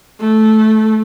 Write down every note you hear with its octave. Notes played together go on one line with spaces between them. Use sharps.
A3